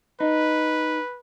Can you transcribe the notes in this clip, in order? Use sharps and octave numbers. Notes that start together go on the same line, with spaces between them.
D#4 B4